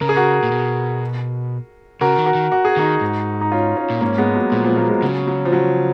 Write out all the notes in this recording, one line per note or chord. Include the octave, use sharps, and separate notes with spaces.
C#3 A#4
G#4
F#4 A#4
A#2
B2
C#3 F#4 A#4
D#3
F#4 A#4
D#3
F#4
G#4
D#3 D#4 F#4
G#2
D#4
C#4 F4
C#4 F4
A#2
G#2 A#3 C#4
G#3 B3
F#3 A#3
A#2 F3 G#3
F3 G#3
F#3 A#3
F3 G#3
C#3 F#3
F#3
F3
F#3